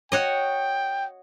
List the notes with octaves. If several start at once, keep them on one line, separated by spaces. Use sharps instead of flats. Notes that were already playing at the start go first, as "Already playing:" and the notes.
F#4 C#5 D#5 G5